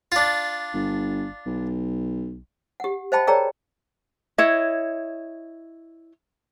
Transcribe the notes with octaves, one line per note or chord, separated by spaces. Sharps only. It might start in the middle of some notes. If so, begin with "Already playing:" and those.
D4 F4
G1
B1
G4 F#5
C5 D#5 F5 G5 A5 B5
G#4 A#4 C#5 D5 G5 A#5
E4 C#5 D#5